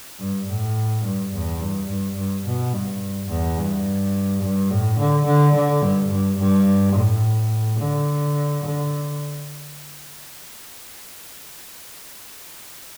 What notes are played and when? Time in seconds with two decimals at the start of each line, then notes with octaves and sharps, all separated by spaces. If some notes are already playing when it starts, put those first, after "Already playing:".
0.20 G2
0.49 A2
1.04 G2
1.33 E2
1.60 G2
1.89 G2
2.17 G2
2.46 B2
2.73 G2
3.29 E2
3.57 G2
4.43 G2
4.70 A2
4.98 D3
5.26 D3
5.55 D3
5.82 G2
6.11 G2
6.39 G2
6.96 A2
7.79 D3
8.64 D3